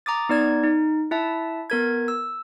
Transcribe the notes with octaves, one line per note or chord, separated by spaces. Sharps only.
A#5 D6 D#6 A6
B3 D#4 D5 G#6
D#4
E4 E5 A5
B3 A#4 G#6
E6